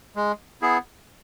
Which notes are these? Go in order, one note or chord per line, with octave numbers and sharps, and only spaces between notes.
G#3
B3 E4 G#4